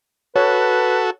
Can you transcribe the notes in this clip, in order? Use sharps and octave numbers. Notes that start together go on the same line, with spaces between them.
F#4 A4 B4 C#5